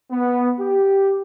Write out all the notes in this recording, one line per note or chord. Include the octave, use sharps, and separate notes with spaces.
B3
G4